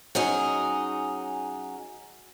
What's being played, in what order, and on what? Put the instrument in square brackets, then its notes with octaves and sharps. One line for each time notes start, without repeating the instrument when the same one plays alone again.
[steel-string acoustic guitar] F#3 C#4 D#4 G#4